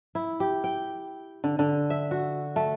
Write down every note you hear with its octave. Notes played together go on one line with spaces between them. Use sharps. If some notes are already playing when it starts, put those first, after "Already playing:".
E4
G4
G5
D3
D3
E5
F#4
A3